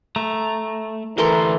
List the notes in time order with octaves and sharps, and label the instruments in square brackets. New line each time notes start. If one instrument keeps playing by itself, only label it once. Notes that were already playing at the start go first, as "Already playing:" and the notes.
[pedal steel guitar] A3 [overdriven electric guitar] A#5
[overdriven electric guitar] D2 C6 [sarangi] E3 [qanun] A4 A#4